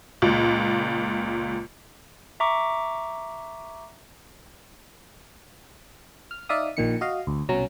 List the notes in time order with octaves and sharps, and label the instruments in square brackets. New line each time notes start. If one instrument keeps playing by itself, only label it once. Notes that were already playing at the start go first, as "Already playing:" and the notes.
[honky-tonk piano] C#2 A#2
[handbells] E5 A#5 C#6 D6
[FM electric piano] F6
D#4 D5 E5 F5 D#6
A#1 A#2 D#3 C#7
F#4 D#5 F5
D2
C2 B2 F#3 C#4 A#5